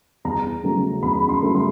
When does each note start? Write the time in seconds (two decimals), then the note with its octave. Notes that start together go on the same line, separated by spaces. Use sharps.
0.25 E2 A#5
0.64 C#3 F#3 A3
1.03 E2 B5
1.29 C6
1.42 C#3 F#3 A3
1.55 C6